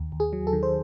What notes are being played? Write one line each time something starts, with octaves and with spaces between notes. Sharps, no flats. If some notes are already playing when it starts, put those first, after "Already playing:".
Already playing: D#2
D#2
G#4
F#3
A4
D#3
C5